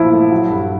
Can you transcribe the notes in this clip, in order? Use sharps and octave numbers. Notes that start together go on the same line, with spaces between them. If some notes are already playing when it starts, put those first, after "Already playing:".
Already playing: B1 A#2 F3 E4
A3
F#3
G2